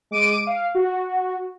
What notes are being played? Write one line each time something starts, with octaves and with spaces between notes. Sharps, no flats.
G#3 D6 D7 D#7
F5
F#4